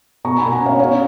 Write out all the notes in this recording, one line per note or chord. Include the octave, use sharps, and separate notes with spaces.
B2 A#5 C#6
A#3 G#5 B5
F#5 A#5
C#4
C#5 F5
C#4 C#5 F5